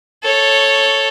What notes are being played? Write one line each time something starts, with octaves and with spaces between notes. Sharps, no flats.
A4 C#5